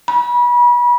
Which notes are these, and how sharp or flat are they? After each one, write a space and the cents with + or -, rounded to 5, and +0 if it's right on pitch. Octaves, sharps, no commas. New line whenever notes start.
B5 -35